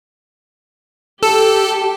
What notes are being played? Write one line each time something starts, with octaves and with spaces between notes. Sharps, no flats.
G4 A4